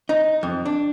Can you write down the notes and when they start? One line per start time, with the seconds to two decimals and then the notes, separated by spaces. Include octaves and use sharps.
0.09 D#4
0.43 F2
0.65 D4